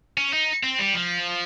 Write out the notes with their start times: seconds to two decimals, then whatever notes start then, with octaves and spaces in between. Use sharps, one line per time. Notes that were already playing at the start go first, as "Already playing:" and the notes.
0.18 C#4
0.33 D#4
0.64 C4
0.79 G3
0.95 F3